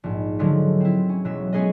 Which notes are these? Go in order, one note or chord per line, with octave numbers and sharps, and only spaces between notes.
A#1 G#2
D3 F3 F#3 G#3 A3 B4
C4 E4
C#4
E1 F#3 E5
G#3 B3 C#4 G#4 B4 D#5